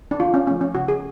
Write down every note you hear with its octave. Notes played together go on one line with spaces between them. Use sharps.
D4
D3 F4
C#4
F3 A3 C#4
C#4
C#3 F#4
G#4